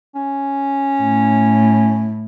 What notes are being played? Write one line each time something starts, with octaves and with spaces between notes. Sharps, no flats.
C#4
A2